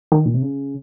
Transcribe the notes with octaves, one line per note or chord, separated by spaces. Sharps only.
D#3
A#2
C3
C#3